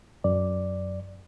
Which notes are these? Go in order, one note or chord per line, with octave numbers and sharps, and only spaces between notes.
F#2 D5